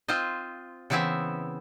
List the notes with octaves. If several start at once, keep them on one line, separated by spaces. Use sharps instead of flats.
C4 F4 C5 D#5
C#3 E3 B3 C4 E4 E5